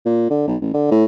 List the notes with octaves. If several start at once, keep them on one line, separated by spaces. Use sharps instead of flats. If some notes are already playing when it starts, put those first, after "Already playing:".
A#2
D3
B1
A1
D3
A2